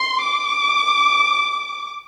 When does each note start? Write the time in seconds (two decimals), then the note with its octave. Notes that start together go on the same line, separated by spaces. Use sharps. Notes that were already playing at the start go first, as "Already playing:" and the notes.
Already playing: C6
0.24 D6